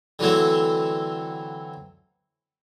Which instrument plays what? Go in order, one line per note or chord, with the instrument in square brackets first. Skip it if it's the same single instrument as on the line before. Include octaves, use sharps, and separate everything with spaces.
[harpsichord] D3 E3 F#3 A3 C4